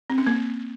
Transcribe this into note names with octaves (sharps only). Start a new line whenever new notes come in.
C4
C#4
A#3